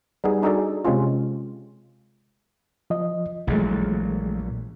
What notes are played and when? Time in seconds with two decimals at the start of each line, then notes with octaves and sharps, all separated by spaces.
0.24 G3 B3 D#4 G#4
0.42 D4 D#4 F#4 G#4 A4 D5
0.85 C3 G#3 C4 C#4 F4
2.90 F3 D#5
3.47 A#1 A#2 E3 F#3 G#3 A3